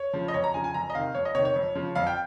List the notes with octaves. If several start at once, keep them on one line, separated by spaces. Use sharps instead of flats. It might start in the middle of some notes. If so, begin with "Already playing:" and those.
Already playing: C#5
C#3 F3
D#5
F2 C#5
A#5
C#3 F3 G#5
G#5
F2 A#5
D#5
C3 D#3 F5
F2 C#5
D#5
C3 D#3 C#5
C#5
F2
C#3 F3
F2 F5
G5